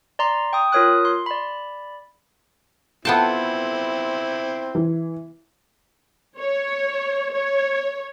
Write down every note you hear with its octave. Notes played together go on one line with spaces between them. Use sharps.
D5 A#5 C6
G5 D#6
F4 A#4 C#5 D#6 F#6
C6
D5 B5
B3 C4 E4 F4 A4 G5 A5
E3
C#5
C#5